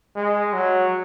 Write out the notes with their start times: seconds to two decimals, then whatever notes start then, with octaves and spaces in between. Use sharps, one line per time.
0.15 G#3
0.53 F#3